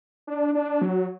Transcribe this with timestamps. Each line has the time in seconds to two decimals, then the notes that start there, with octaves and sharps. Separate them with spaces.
0.27 D4
0.55 D4
0.82 F#3